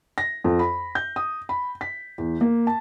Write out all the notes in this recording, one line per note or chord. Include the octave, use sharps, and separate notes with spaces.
A#6
F2
B5
G6
D#6
B5
B6
E2
A#3
A5